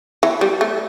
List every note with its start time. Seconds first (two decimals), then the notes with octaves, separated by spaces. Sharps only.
0.23 E3
0.41 G3
0.61 A3